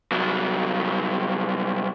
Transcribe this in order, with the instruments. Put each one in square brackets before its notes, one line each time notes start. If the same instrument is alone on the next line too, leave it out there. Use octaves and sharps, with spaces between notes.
[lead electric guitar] C2 F#3